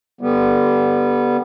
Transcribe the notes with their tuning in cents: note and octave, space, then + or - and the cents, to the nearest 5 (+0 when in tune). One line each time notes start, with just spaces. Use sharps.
D3 -5 G3 +0 B3 -15